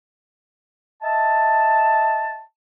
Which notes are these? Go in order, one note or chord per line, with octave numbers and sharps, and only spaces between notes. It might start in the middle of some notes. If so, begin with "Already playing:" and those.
D#5 E5 A5